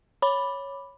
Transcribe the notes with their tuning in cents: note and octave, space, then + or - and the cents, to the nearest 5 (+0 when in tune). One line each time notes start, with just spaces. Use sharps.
C#5 +0 B5 +0 D6 +0